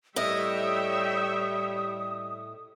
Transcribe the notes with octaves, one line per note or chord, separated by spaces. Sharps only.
A2 G3 C#5 D#5 E5 G5 D#6